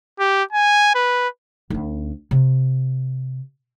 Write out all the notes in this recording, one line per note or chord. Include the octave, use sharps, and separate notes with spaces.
G4
G#5
B4
D2 C#4
C3